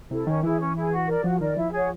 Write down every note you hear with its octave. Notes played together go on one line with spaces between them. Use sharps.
C3 E4 A4
D#3 C#4
E3 E4 G#4
C#4
E4 G#4
F#4
A#4 D5
F3 F#4
D#3 A#4 D5
F3 E4
G#4 C#5 F#5